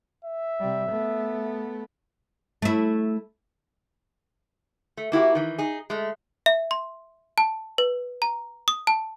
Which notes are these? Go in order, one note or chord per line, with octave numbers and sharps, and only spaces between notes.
E5
C3 G3
A3 B3
A3 E4
A3
A#3 E4 F#4 G4
D#3 E3
D#4 G#4
G#3 A3
E5
C6
A5
B4
A#5
D#6
A5